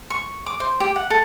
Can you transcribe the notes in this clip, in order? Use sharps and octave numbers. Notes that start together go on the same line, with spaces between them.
C#6
D6
C5
G4
F#5
A4